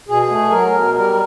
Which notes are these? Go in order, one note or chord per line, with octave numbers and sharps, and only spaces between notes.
B2 G#4
A3
F#3 A#4
B2
G3 A#4